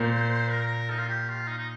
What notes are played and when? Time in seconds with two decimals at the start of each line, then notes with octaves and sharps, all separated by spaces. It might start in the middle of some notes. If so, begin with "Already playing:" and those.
Already playing: A#2 C5
0.50 A#4
0.90 D#4
0.99 F4
1.08 G4
1.28 F4
1.47 D#4
1.58 D#4